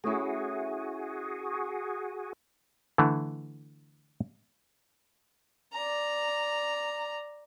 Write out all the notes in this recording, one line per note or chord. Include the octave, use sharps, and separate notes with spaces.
A3 C#4 E4 F#4 G#4
D3 E3 A3
D5 A#5